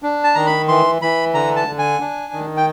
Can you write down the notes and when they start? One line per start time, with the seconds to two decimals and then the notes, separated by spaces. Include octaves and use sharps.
0.03 D4
0.24 A5
0.35 D#3 A#5
0.47 B5
0.68 E3 C6
1.02 E3 B5
1.34 D3 A#5
1.56 A5
1.67 D3
1.79 G#5
2.00 D4
2.33 D#3
2.57 G5